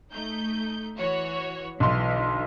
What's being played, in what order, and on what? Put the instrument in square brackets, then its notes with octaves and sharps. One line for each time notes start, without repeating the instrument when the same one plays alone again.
[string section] A3 D#4 G6
E3 F#4 C#5
[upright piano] B1 C6 [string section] D3 E3